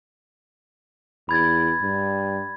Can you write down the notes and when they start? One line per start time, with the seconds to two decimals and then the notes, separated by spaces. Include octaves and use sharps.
1.29 E2 B5 G#6 A6
1.81 G2